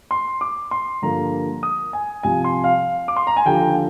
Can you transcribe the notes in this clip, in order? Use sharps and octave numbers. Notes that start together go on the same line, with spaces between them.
C6
D6
C6
G2 D3 F3 A#3 A#5
D#6
G#5
C2 C3 F3 G#5
C6
F5
D6
C6
A#5
G#5
D#2 D3 F3 G5